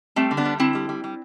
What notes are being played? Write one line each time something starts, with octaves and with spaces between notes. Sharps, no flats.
G3 A3 C4
D3
B3 D4
G3
D3 C4 E4
G3
G3
G3